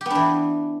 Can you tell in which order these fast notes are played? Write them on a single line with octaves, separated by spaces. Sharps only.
G4 B3 D4 E3